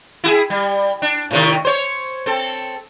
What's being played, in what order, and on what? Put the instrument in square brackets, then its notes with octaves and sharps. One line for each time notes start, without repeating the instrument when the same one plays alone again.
[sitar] E4 F#4 G#4
G3
D4
A2 C3 D#3
C5 C#5
C4 A4